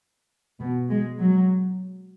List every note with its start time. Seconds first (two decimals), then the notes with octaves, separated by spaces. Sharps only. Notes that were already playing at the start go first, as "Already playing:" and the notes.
0.60 B2
0.89 G#3
1.19 F#3